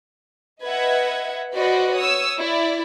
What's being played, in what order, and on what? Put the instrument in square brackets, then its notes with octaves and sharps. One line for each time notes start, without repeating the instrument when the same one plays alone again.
[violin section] B4 D#5 E5 F#5 G#6
F#4 B4 C5 D5 D#5
C#5 D#6 E6
E4 D5